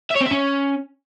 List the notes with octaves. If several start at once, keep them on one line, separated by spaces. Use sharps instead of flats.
E5
C#5
C4
E5
C#4